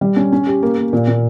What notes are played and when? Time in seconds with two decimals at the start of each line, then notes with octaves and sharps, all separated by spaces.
0.01 G3
0.16 C#4
0.32 C#4
0.47 G4
0.62 A#3
0.77 A#3
0.93 A#2
1.08 A#2